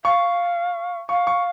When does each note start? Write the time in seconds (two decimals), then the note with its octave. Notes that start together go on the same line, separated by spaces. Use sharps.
0.05 F5 C#6
1.09 F5 C#6
1.27 C#6